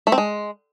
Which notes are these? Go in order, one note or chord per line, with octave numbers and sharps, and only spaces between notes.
A3
C4
G#3